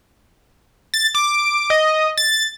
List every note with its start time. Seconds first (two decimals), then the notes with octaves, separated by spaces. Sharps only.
0.94 A6
1.15 D6
1.70 D#5
2.17 A6